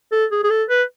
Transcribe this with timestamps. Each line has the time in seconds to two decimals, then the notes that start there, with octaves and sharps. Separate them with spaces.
0.12 A4
0.32 G#4
0.44 G#4
0.50 A4
0.69 B4